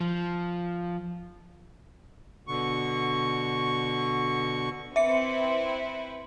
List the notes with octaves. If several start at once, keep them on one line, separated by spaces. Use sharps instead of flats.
F3
B2 D3 C#6
C4 E4 B4 E5 C#7